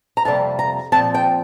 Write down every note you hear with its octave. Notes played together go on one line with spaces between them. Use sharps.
A#5
F2 C3 G3 A#3 A5
A#5
A#2 F3 C4 A5
G5